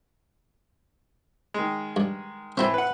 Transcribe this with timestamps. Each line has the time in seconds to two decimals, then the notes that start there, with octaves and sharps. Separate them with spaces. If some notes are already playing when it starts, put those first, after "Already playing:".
1.54 D#3 G#3
1.96 G2
2.57 A2 E3 C4 E4 C5
2.74 B4 F#5